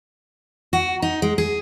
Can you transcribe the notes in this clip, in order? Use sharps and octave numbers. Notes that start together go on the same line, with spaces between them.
F#4
D#4
G#3
G#4